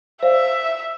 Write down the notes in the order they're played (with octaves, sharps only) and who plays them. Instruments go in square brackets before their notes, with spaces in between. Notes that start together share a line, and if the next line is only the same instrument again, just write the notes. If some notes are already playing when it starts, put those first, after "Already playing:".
[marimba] C5 D5 F5 [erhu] E5